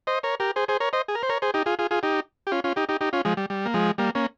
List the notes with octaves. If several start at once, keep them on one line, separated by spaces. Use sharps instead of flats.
C5 D#5
A#4 C#5
G4 A#4
G#4 C5
G#4 C5
A#4 C#5
C5 D#5
G#4
A#4
C5
A#4 C#5
G#4 C5
D#4 G4
F4 G#4
F4 G#4
F4 G#4
D#4 G4
G4
C#4 F4
C#4 F4
D#4 G4
D#4 G4
D#4 G4
C#4 F4
F3 G#3
G3
G3
A#3
F3 G#3
G3 A#3
A#3 C#4